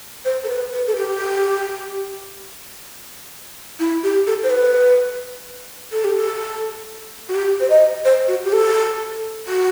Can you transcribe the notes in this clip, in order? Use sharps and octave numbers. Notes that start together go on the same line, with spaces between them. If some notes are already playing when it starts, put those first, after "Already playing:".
C5
A4
B4
B4
A4
G4
E4
G4
A4
C5
B4
A4
G4
A4
F#4
G4
C5
D#5
C5
F#4
G4
A4
F#4